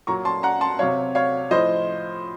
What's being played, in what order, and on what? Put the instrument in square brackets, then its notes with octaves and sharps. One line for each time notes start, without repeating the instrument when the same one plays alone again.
[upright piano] A#2 F#3 A#5 C#6
A5 C6
F#5 A#5
A5 C6
C3 F#3 C#5 F5
C#5 F5
A2 F3 C5 D#5